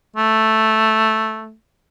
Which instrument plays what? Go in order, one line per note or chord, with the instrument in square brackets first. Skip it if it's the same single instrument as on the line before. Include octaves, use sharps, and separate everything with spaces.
[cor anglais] A3